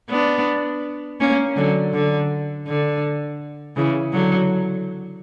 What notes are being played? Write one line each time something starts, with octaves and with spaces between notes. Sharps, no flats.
B3 D4
A#3 C#4
D3 F#3
D3
D3
C#3 E3
D3 F#3